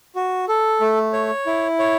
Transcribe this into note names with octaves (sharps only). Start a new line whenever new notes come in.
F#4
A4
A3
C#5
E4
C#5